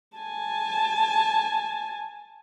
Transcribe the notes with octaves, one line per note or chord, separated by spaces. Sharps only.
G#5 A5